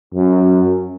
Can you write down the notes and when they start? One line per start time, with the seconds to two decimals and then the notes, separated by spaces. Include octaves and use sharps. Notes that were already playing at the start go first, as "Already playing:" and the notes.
0.14 F#2